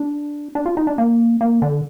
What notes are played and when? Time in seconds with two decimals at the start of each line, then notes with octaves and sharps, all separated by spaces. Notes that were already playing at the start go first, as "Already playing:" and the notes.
Already playing: D4
0.55 D4
0.66 F4
0.77 D#4
0.87 D4
0.98 A#3
1.41 A#3
1.62 D3